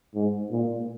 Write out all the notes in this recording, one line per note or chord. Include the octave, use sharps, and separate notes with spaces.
G#2
A#2